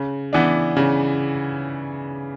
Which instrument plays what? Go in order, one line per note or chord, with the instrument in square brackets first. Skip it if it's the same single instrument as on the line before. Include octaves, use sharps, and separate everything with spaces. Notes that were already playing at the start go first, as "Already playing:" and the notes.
Already playing: [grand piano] C#3
E3 B3 D4
C#3